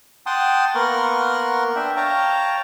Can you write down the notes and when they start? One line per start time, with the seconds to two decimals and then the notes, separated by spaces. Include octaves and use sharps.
0.26 F#5 G5 A5 C6 D#6
0.75 A#3 B3 A#4 F#5 C6 C#6
1.76 D4 E5 G5
1.96 C#5 F5 G5 A5 A#5